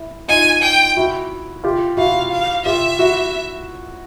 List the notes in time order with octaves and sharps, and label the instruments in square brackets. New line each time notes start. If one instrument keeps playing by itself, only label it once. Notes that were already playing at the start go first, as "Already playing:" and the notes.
Already playing: [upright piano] E4
[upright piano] D#4 F4 [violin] G#5
[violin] G5
[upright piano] E4 F#4
F4 G4
[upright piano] E4 F#4 [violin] F5
[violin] F5
[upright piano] F4 G4 [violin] E5
[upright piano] E4 F#4